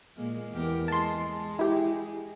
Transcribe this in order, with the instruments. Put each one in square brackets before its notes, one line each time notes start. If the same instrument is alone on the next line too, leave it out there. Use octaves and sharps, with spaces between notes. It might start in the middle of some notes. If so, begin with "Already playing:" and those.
[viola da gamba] A#2 G#3 A#3
E2 G4 A#4
[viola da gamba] G#3 [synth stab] A5 C6
[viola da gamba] G#3
[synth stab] E4 G4